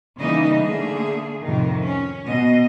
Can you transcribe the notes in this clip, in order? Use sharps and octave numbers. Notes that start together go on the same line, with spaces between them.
C#3 E3 G3 A#3 D#4 D#5
D3 A3 A#3 G#4
F2 A2 C3 D#3
C#4
B2 D#5